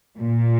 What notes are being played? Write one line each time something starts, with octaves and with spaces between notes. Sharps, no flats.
A#2